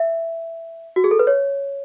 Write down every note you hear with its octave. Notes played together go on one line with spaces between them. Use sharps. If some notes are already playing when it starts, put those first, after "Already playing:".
Already playing: E5
F#4
G#4
A4
B4
C#5